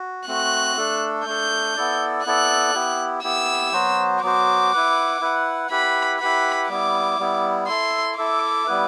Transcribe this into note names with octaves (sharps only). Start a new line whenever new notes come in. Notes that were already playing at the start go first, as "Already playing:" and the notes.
Already playing: F#4
A3 C4 F#4 F#6
A3 D4 A4
A3 D4 A4 G6
B3 E4 A4 D5
B3 E4 A4 D5 F#6
B3 E4 G4
B3 E4 G4 E6
F#3 B3 F#4 C5
F#3 B3 F#4 C5 D6
E4 B4 F#5
E4 B4 F#5
E4 G4 B4 F#5 B5
E4 G4 B4 F#5 B5
G3 B3 E4 D6
G3 B3 E4
E4 A4 E5 C6
E4 A4 E5 D6
G3 B3 E4 B4